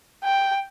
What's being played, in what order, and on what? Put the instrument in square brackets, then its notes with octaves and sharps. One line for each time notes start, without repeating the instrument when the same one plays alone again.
[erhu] G5